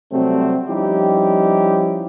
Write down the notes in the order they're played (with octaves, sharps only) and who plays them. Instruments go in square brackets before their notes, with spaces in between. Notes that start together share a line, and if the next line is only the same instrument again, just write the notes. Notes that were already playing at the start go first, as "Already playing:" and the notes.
[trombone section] C3 F#3 G3 A3 C4
F3 G3 C#4 D#4 E4 G4